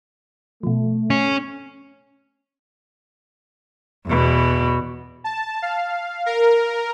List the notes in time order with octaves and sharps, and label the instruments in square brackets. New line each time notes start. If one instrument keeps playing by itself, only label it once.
[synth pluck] B2 F3 [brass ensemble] A3
[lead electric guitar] C#4 [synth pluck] C7
[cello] E2 B2
[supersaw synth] A5
F5
A#4